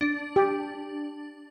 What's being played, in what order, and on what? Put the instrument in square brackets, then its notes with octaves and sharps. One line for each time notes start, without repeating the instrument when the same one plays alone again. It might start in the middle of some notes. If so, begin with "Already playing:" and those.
[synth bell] D4
[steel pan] G4